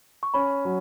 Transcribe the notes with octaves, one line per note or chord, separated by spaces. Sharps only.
C#6
C#4 B5
F#3